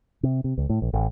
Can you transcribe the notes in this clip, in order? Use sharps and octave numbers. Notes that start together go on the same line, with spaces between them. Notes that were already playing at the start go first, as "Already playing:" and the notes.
C3
C3
C#2
A2
A#1
A1